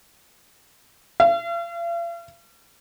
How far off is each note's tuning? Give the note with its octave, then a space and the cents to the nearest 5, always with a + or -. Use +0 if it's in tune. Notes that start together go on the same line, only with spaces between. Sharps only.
F5 -45